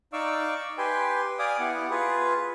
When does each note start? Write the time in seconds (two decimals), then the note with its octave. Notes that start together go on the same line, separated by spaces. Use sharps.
0.13 D#4 D5 F5 C#6 D6 E6
0.78 G4 B4 G5 G#5 C6
1.39 D5 F5 G#5 D6 D#6
1.59 B3 E4 G4 F#5
1.91 F4 G#4 B4